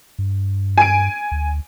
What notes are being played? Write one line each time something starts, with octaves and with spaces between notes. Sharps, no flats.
G2
G#5 D7
D2